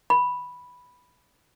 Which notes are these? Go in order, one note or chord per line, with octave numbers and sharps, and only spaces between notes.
B5